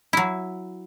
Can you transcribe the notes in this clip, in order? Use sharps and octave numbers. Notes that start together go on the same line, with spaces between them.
F#3 E4